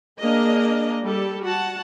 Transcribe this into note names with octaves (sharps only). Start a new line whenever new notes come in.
A#3 D4 G#4 D#5
G3 A4
F#4 F#5 A5